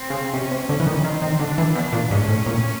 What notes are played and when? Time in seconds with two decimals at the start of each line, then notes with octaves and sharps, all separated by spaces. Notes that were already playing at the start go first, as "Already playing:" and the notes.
Already playing: C4
0.10 C#3
0.33 C3 C#4
0.51 C3
0.68 D3 C#4
0.80 E3
0.87 D#3
1.04 D#3 C4
1.22 D#3
1.40 D3 D4
1.58 E3
1.75 B2 D4
1.93 A#2
2.11 G#2 C#4
2.28 A2
2.46 A#2